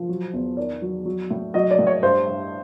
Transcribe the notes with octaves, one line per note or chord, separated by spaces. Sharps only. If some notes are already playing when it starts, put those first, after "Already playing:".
Already playing: F3
F#3
E2
D#3 D5
F#3
F#3
A2
F#3 D#5
D5
A2
C#5
G2 C5
G2